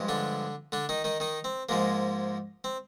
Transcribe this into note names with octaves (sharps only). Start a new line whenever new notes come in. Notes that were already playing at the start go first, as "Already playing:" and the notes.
Already playing: G2 F3 G#3
D3 D4
D3 D4
D#3 D#4
D#3 D#4
D#3 D#4
C4
G#2 F3 G#3 A#3
C4